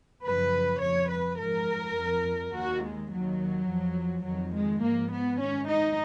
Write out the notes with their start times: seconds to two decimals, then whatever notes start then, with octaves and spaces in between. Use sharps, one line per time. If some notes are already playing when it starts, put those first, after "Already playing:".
0.25 F#2 C#3 F3 B4
0.82 F2 F3 C#5
1.11 B4
1.39 G#2 F3 A#4
1.96 F2 F3
2.53 D#2 D#3 F#4
2.82 G#3
3.11 D#2 D#3 F#3
3.67 F2 F3
4.24 F2 D#3 F#3
4.54 G#3
4.81 G#2 F3 A#3
5.11 B3
5.39 G#2 D#3 C#4
5.68 D#4